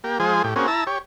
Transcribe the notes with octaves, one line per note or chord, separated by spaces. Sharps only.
A#3 G4
F3 G#3 G#4 C5
A2 G4
A#3 C4 C#4 F#4 G#4
E4 A5 A#5 E6
G4 C#5